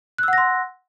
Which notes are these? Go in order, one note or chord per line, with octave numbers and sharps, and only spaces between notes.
F#5 C6 E6 F#6 A#6